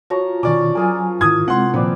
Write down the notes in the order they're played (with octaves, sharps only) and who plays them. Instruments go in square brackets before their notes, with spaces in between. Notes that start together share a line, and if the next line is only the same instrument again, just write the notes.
[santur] F3 A#5 C#6 [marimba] F#4 C#5 A#6
[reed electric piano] B2 D#3 [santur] C#4 C#6 [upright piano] D5 D6
[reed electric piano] F#3 G#5 [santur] F4 G#4 A#4
[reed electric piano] G#2 D#3 [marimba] E4 [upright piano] D#6 G#6
[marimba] C3 [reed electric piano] G#3 C4 [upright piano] F#5 C6
[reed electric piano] A#2 [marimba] D#3 F3 A#3 [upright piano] C4 [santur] B4 C5 D5